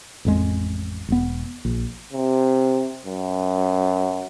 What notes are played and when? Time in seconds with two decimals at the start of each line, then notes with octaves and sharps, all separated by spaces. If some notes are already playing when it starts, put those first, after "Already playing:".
0.25 A1 F2 G#3
1.08 E1 B3
1.65 A#1
2.13 C3
3.05 F#2